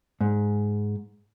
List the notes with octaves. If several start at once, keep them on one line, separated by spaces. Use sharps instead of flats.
G#2